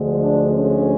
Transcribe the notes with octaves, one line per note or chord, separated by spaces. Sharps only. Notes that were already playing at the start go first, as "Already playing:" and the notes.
Already playing: D2 D3 F3 G#3
D4
C#4